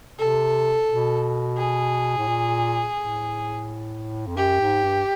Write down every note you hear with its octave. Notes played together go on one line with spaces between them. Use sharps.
C3 A4
B2
G#4
A2
A#2
A2
F2
F#2 G4
G#2
G2